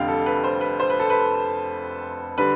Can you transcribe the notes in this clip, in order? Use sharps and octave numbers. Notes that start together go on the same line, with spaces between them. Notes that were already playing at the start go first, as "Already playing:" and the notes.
Already playing: F1 F2 D3 G3 F5 G5
A4
B4
C5
B4
C5
B4
A4
B4
D3 G3 B4